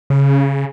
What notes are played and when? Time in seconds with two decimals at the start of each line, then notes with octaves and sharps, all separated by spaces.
0.10 C#3